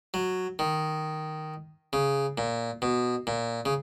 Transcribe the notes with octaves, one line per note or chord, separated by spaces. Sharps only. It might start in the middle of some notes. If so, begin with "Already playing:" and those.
F#3
D#3
C#3
A#2
B2
A#2
C#3